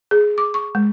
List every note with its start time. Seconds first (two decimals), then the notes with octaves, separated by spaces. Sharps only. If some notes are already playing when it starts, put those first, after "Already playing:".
0.11 G#4
0.38 D6
0.54 C#6
0.75 G#3